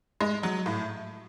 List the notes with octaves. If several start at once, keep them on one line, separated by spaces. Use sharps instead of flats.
G#3
F#3
A2